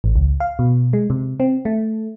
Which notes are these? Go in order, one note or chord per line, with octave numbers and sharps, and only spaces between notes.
A1
C#2
F5
B2
G#3
C3
C4
A3